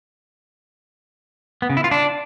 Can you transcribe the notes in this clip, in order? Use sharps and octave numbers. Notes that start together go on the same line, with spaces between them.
B3
C#3
E4
F4
D4